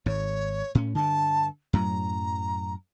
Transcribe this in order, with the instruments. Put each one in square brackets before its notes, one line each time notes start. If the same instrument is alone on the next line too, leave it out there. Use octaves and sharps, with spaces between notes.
[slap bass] G#1 G#2 [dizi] C#5
[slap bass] A2 C#4
[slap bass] G2 D3 [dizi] A5
[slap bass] F#2 A2 F#3 [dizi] A#5